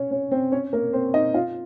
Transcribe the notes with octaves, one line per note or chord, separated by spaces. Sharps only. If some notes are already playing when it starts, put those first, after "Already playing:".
Already playing: C#4 C#5
C#4 C#5
C4 C5
C#4 C#5
A#3 A#4
C4 C5
D#4 D#5
F4 F5